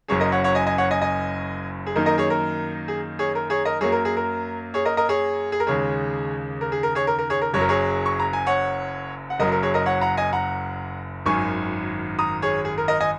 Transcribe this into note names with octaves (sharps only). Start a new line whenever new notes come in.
F#1 F#2 F#3 C#4 G#4 C#5
A#4 D#5
C#5 F#5
C#5 F#5
D#5 G#5
D#5 G#5
C#5 F#5
D#5 G#5
D#5 G#5
G#4
F#2 D#3 A#3 D#4 A#4
A#4 D#5
G#4 C#5
A#4
G#4
G#4 C#5
A#4
G#4 C#5
A#4 D#5
F#2 F#3 A#3 G#4 C#5
A#4
G#4
A#4
G#4 C#5
A#4 D#5
A#4 D#5
G#4 C#5
G#4
A#4
D#2 C#3 G#3 G#4 C#5
A#4
G#4
A#4
G#4 C#5
A#4
A#4
G#4 C#5
A#4
F#1 F#2 F#3 C#5
A#4
G#4 C#5
C#6
A#5
G#5
C#5 F#5
F#5
F#1 F#2 F#3 A#4 D#5
A#4
G#4 C#5
A#4 D#5
C#5 F#5
F#5 A#5
D#5 G#5
F#5 A#5
G#1 F#2 D#3 G#5 C#6
A#5 D#6
G#4 C#5
G#4
A#4
A#4 D#5
D#5 G#5